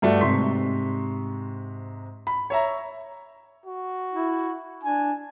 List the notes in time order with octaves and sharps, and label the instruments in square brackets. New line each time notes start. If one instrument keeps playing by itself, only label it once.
[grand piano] G2 A3 D4 F#4
G#2 C3 C6 C#6 B6
B5
C#5 E5 A#5
[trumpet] F#4
[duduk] E4
[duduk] D4 [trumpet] G#5